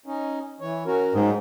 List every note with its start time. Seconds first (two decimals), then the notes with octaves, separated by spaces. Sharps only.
0.06 C#4 D#4
0.61 E3 C#5
0.86 C#4 F#4 A#4
1.14 G#2 F#3 G#4 G5